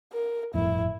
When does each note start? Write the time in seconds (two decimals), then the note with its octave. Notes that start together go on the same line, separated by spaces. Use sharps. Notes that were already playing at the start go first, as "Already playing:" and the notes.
0.13 A#4
0.54 G1 F2 A2 E4